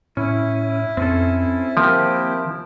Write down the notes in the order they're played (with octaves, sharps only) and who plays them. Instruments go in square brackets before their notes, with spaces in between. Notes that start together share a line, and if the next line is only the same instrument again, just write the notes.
[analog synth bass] A2 [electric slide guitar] C#4 [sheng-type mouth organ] E4
[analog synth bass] F2 [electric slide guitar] C4 C#4 A4
[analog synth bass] D#3 [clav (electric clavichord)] F3 [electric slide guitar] A#3 C4 G4